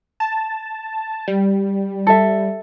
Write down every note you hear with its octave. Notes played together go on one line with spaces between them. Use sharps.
A5
G3
A4 E5